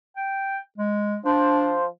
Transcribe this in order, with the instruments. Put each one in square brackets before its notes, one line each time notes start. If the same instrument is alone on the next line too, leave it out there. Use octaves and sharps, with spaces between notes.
[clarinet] G5
G#3
[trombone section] F3 C5 [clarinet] D4